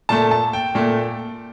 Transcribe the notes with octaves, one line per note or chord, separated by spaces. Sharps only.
A#2 A3 A5
A5
G5
A#2 A3